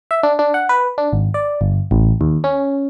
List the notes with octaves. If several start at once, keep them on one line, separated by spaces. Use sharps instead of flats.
E5
D4
D4
F#5
B4
D4
G#1
D5
G1
A1
D#2
C#4